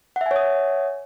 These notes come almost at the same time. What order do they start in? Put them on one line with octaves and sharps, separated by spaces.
F#5 E5 G#5 C#5 D#6